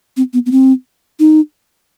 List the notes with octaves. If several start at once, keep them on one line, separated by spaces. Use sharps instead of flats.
C4
B3
B3
C4
D#4